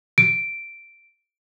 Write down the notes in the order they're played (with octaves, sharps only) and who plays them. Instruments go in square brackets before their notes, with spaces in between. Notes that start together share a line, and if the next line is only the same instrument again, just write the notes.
[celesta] D7